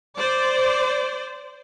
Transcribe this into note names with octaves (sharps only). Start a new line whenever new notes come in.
C5 D5